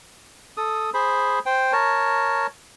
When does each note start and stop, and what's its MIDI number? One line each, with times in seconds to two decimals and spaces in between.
0.57 0.90 69
0.57 0.90 87
0.94 1.39 68
0.94 1.39 72
0.94 1.39 83
1.46 1.72 72
1.46 1.72 79
1.73 2.47 70
1.73 2.47 73
1.73 2.47 81